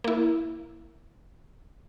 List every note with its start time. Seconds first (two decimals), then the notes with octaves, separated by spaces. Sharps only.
0.04 A#3 E4